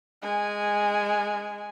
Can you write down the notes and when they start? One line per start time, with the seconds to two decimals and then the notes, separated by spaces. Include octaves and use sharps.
0.23 G#3 G#5